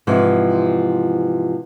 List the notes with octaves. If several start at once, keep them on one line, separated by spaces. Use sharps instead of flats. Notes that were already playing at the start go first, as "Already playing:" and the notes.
G#2 C3 E3 F3